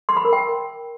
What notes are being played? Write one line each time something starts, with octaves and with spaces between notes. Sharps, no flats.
C6
B5
A#4
G5